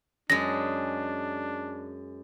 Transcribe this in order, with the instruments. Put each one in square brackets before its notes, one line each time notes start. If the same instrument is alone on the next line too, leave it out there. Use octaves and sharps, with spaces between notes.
[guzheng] F#2 G#3 [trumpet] D4 [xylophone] A#6